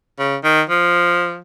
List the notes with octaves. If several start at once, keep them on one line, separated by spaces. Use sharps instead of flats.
C#3
D#3
F3